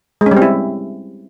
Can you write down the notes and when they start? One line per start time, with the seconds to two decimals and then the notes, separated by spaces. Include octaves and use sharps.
0.21 G#3
0.26 C#4
0.31 G3
0.37 C4
0.42 E4